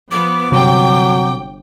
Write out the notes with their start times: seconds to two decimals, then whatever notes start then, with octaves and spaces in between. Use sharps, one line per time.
0.11 F3 B3 D6
0.52 G1 C3 F#3 G5